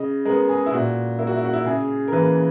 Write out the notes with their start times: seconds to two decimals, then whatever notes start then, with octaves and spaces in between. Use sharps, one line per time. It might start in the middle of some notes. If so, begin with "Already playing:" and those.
Already playing: C#3 D#5
0.25 G#3 B3 A#4
0.49 G#4
0.66 E4
0.72 A#2 F#4
1.19 A#3 E4
1.27 F#4
1.36 E4
1.45 F#4
1.53 E4
1.65 C#3 G#4
2.08 A#4
2.12 E3 A#3 B4